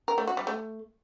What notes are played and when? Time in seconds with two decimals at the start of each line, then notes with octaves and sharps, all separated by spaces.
0.08 A#4
0.18 A3
0.27 F#4
0.37 G3
0.47 A3